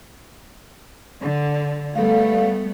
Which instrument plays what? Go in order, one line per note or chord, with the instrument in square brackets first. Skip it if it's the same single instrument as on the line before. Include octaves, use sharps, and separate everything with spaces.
[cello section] D3
[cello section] G3 A3 B3 [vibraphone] A4 F5